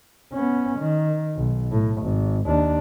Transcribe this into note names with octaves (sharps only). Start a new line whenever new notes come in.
B3 C#4
D#3
B1
A2
G#1
D#2 D4